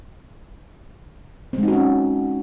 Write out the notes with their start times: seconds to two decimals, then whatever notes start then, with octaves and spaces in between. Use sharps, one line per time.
1.53 C4
1.58 G#3
1.63 D#4
1.68 F#4
1.73 C#4